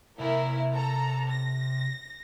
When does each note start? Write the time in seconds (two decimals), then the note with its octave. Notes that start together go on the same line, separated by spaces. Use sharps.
0.20 C3 A#3 E4 A#4 G#5
0.75 A4 A#5
1.33 A#6